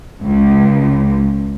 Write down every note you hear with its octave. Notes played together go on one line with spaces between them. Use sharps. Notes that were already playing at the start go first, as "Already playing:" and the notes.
C#2